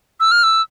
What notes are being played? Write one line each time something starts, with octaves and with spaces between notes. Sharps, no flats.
E6
F6
E6